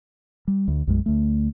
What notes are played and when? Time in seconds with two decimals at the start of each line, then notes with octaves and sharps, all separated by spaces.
0.48 G3
0.68 D2
0.87 B1 F#2 G#3
1.06 D2 A3